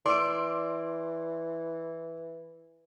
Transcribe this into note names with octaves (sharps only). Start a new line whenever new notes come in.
E3 D5 C6 E6 D7